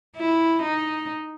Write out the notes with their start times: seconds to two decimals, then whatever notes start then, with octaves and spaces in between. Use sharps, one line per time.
0.17 E4
0.62 D#4